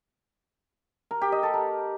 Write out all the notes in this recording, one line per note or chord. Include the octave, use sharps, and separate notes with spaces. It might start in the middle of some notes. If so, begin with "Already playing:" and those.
A#4
G4
D#5
A4
A#4